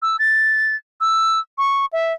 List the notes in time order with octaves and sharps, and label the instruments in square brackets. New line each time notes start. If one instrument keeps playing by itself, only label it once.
[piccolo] E6
A6
E6
C#6
E5